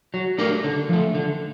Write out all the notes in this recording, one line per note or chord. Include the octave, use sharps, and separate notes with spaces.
F#3
A3 D4 G4 A#4
D3
F3 A3
D3